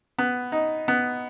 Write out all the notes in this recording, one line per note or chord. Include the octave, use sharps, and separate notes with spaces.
B3
D#4
B3